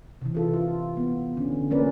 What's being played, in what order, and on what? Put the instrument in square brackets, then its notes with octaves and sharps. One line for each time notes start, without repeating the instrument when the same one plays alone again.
[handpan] C3 E3
F4 A4
F4
B3
D3 C#4
F3 A#3 C#4 A#4 B4 D5